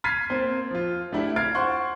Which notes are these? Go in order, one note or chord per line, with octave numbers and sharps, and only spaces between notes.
F6 G#6 A6 B6 C7 D#7
A#3 C4 C5
F3 F4
A3 D4 E4 G4
F6 G#6 A6 C7 D7
C5 F#5 C6 C#6